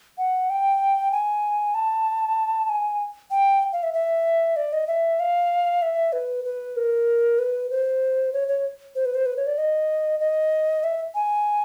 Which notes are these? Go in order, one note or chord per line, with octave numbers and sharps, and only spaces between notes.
F#5
G5
G#5
A5
G#5
G5
F5
E5
E5
D5
D#5
E5
F5
E5
B4
B4
A#4
B4
C5
C#5
C#5
C5
B4
C5
B4
C#5
D5
D#5
D#5
E5
G#5